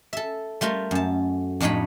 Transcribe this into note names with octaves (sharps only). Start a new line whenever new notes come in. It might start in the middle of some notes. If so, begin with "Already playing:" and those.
A4 E5
G3 A3 F4 A#4
F#2 A5
F2 A2 D4 D#4 C#5 B5